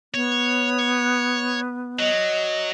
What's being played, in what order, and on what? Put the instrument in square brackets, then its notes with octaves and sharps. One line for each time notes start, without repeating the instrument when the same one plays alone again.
[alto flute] B3 [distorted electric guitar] C#5
[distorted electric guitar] F#3 [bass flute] D#5